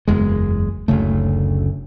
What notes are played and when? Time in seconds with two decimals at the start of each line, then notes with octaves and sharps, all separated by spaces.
0.08 F#1 E2 G#3
0.88 F#1 D2 C#3 A3